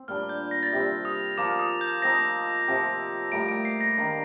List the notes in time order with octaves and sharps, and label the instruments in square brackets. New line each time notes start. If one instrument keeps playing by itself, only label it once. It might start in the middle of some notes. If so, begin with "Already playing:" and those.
Already playing: [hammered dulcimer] C4
[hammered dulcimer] A#2 G3 D4 [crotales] F6
[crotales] G6
A#6
A6
[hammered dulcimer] C3 G3 C4 [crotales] A#6
[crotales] D#6
[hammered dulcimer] F3 A#3 F4 [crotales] D6
[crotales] D#6
G6
[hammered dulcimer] F3 C4 D#4 [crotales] A#6
[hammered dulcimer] C3 F3 C4 G4
[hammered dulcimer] A2 G3 A#3 [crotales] D7
[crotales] D7
C7
A#6
[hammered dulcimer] D#3 A#3 D4